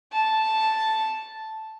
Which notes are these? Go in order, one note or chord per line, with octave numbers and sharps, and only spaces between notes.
A5